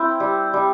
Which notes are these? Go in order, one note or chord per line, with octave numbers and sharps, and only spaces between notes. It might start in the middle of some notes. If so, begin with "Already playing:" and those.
Already playing: C4 E4 G5
G3
G3